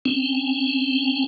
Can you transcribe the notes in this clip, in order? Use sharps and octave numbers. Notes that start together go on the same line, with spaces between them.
C4 C#4